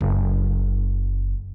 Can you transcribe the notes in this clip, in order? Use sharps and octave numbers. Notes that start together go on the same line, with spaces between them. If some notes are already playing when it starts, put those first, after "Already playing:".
F#1